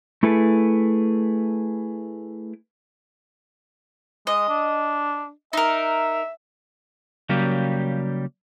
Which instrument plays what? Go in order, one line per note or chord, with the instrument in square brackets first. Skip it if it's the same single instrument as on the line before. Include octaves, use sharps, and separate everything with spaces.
[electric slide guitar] A3 E4 G#4 A4 B4
[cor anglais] G#3 [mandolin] D#5
[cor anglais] D4
[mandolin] D#4 A#4 [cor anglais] E5
[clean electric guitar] C#3 F#3 G3 A#3 G4